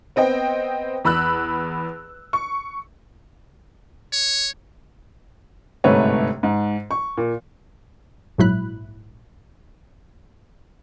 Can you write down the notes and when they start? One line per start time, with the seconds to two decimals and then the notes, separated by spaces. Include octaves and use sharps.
0.16 B3 C4 D#5 G5
1.05 E2 B5 E6 F#6
2.33 C#6
4.13 C#5
5.84 G1 G#2 C3 A3 B4 C#5
6.43 G#2
6.91 C#6
7.17 A#2
8.38 A#1 G#2 F#3 E4 B5 F#6